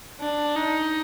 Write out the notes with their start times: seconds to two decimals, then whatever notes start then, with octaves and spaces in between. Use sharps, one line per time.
0.21 D4
0.56 D#4